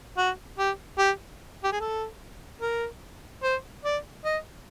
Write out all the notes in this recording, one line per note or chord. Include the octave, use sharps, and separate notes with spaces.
F#4
G4
G4
G4
G#4
A4
A#4
C5
D5
D#5